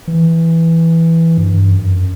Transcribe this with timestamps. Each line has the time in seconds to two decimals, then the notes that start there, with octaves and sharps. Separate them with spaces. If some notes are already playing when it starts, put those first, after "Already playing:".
0.08 E3
1.37 G2
1.70 F#2